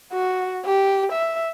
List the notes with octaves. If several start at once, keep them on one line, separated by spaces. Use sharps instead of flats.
F#4
G4
E5